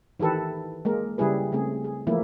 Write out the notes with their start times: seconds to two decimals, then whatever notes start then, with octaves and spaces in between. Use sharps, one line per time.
0.20 D#3 E3 G4 A4 B4
0.85 G#3 A#3 A#4
1.18 C#3 G3 E4 G#4 B4
1.52 C#3 A3 C4 G#4
1.84 G#4
2.07 E3 F3 A3 A#3 E4